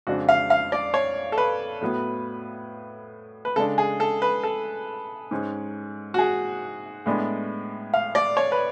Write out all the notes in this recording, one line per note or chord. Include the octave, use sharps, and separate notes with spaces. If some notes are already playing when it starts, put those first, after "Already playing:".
F2 C#3 G#3 D4 F#4
F5
F5
D5
C#5
A4
B4
A2 F#3 B3
B4
C#3 G#3 D4 A4
G#4
A4
B4
A4
G#2 G#3 C#4
F#4
G#4
A2 G#3 B3 D4
F5
D5
C#5
B4